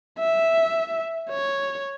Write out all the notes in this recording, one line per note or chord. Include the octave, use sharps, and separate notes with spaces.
E5
C#5